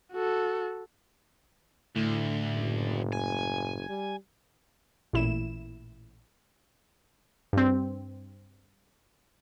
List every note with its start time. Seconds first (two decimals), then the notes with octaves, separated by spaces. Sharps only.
0.12 F#4 A4
1.96 D2 A2 D3
2.55 F#1
3.12 G#5
3.89 G3
5.13 A1 A#2 E4 E7
7.53 G2 C4